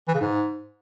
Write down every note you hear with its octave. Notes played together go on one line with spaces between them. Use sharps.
E3
C#3
G#2